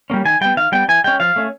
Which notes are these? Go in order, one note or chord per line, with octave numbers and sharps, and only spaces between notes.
G3 A#3 C#4
D#3 G#5
G3 B3 G5
D#3 F5
G3 B3 G5
E3 G#5
G#3 C#4 G5
F3 F5
A3 C#4